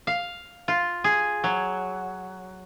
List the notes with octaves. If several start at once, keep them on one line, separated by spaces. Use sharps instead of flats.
F5
F4
G#4
F#3